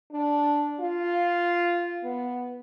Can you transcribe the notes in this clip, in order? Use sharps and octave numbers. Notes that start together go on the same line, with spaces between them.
D4
F4
B3